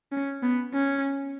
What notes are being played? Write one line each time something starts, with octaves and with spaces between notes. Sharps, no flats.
C#4
B3
C#4